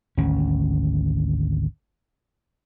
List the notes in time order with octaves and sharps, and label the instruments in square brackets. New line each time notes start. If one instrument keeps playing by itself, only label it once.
[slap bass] G#1 D2 C#4